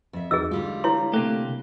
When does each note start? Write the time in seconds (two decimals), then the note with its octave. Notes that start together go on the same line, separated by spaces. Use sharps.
0.13 F2 E5
0.31 E2 D#4 F#4 G#4 D#5 E6
0.51 D3 G3 G#3 F4
0.84 E4 C#5 C6
1.14 C3 A3 A#3 G4 A4 F#6